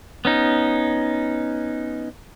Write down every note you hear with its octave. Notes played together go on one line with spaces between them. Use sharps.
B3 C#4 D#4